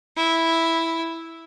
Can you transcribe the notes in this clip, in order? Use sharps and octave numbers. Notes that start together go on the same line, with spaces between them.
E4